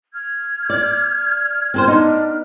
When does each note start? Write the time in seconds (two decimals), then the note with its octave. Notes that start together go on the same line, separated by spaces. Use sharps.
0.14 F6 G#6
0.70 D5
1.74 C4 A4 C5
1.87 B3 D4 D#4